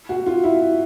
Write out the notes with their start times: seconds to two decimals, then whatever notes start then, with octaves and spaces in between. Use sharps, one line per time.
0.09 F#4
0.26 F4
0.44 E4